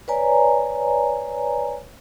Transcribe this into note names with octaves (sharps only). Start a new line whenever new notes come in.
B4 C#5 D5 G#5 A#5